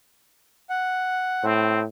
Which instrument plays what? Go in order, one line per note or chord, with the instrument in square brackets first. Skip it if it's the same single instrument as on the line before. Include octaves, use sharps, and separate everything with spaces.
[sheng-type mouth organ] F#5
[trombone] A2 [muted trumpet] C4